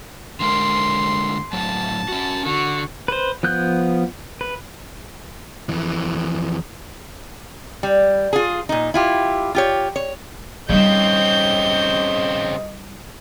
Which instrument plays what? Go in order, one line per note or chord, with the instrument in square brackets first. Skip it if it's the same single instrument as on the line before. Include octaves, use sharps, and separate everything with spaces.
[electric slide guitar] D3 G#3 A#4 [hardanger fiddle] C6
[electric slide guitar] A2 F#3 [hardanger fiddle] A5
[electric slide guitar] C#4 F#4
[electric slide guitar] D3 [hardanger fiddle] F#4
[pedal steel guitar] B4 C5
F3 B3 F#6 G6
B4
[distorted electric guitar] F2 E3
[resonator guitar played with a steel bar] G3
F4 G#4
A#2 D#4
E4 F4 G4
F4 G4 C#5
C#5
[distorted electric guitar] C#3 C4 [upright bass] G3 D#4 [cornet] D#5 [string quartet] G6